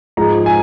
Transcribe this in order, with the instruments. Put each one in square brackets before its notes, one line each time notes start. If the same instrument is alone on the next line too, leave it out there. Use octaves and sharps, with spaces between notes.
[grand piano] G#2 F3 G#3 A#5
G#5